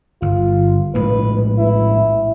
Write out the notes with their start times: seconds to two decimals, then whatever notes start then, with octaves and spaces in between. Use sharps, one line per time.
0.22 G1 F4
0.95 A#1 A2 G#3 B4
1.58 E4